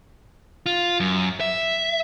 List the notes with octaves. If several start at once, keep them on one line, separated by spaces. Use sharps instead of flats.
F4
F#2
E5